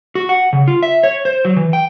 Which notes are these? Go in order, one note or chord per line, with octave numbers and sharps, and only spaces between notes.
F#4
F#5
C#3
F4
E5
C#5
C5
F#3
E3
G5